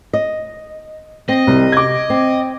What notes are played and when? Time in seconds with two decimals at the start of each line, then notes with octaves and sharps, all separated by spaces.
0.13 D#5
1.29 C4 D#5
1.47 C2 C3
1.72 D6 G#6
2.10 C4